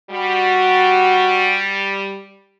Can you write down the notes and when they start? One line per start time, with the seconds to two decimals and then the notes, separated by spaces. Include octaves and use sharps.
0.11 G3 F#4